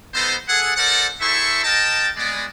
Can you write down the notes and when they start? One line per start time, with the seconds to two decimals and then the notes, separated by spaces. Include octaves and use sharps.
0.14 B3 D#4 A4 B4 C5
0.48 G#4 A4 F#5
0.76 A4 A#4 C5 D5 F#5
1.20 E4 G#4 A4 C5 E5 C#6
1.63 A#4 D#5 G5 A5
2.16 G#3 B3 D5